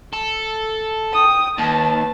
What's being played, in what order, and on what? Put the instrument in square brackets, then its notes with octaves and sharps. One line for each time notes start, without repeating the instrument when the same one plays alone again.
[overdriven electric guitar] A4
[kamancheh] G5 D#6
[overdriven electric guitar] D#2 [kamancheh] B4 A5